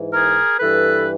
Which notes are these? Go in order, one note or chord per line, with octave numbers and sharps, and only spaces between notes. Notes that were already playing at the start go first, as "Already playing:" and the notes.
Already playing: G#2 E3
G#4 A#4
G2 E3 A4 B4